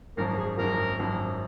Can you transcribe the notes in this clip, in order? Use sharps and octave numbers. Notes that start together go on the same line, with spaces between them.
G#1 F#2 F3 A#4
G#4
G#1 F#2 F3 A#4
G#1 F#2 F3